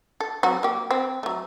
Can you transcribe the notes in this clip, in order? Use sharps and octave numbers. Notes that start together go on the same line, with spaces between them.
A4
F#3 C4 F#4
A#3 G4
C4
F#3 A3